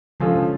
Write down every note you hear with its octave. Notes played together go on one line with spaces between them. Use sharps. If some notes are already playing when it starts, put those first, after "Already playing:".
D3 F3 G#3 C#4 F4 A4
C#3